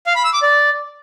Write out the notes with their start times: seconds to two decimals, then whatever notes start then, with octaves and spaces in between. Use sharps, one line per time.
0.07 F5
0.16 B5
0.24 E6
0.33 D6
0.42 D5